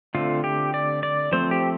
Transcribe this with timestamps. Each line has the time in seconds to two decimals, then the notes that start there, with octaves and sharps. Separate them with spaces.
0.15 D3 A3 C4 F4
0.44 G4
0.74 D5
1.03 D5
1.32 F3 A3 C4 C5
1.51 G4